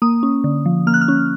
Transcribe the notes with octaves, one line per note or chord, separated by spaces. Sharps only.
A#3 D#6
C#4
D3
F3
A#3 F6
F#6
F6
C#4